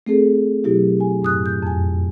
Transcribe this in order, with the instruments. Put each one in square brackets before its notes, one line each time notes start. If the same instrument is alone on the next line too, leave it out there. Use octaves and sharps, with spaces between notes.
[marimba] A3 C4 G#4 A4
B2 F#3 E4 G4
G#5
F#2 A2 D#6 F#6
G6
F2 G#5